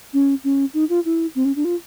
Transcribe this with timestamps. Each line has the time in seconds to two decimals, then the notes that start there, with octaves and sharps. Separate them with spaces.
0.13 C#4
0.44 C#4
0.74 D#4
0.89 F4
1.05 E4
1.35 C4
1.45 C#4
1.56 D4
1.65 F4